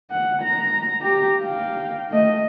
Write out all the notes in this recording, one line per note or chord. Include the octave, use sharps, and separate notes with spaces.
F#5
A#5
G4 A#5
F5 G5
A3 D#5